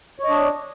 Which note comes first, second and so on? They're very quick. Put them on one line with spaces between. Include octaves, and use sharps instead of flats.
C#5 D#5 D4